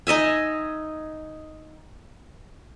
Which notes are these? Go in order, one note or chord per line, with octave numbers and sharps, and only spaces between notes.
D#4 D#5 E5 G#5